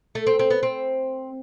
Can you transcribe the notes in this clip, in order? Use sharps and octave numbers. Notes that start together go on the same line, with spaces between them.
A3
C4
C4
B3
C4